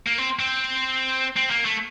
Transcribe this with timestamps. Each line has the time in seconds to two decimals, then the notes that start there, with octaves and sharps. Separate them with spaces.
0.07 A#3
0.18 C4
0.39 C4
1.37 C4
1.51 A#3
1.66 A3